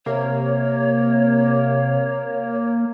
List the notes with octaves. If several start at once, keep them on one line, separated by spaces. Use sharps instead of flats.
C3 A#3 C#5